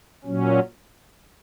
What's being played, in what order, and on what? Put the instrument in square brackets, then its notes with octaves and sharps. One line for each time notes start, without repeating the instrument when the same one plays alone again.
[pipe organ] A#2 F#3 C#4